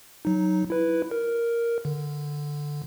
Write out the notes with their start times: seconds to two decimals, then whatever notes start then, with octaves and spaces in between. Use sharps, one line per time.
0.25 F#3 D#4
0.70 E4 B4
1.11 A#4
1.85 D3